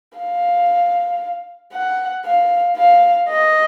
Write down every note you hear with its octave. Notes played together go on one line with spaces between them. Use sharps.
F5
F#5
F5
F5
D#5